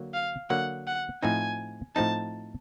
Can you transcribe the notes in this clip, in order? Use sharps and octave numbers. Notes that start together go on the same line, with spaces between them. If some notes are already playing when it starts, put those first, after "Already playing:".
Already playing: D3 F#3 A#3
F5
D3 F#3 A#3 F#5
F#5
A2 F3 A3 C4 D#4 G#5
A2 F3 A3 C4 D#4 A5